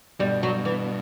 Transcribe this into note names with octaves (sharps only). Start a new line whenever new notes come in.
G2 B2 G3
F#3
E3